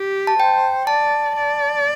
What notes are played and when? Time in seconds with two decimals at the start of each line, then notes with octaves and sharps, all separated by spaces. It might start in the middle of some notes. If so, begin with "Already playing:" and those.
Already playing: G4
0.27 A5
0.39 C5 G5
0.87 D5 A5
1.36 D5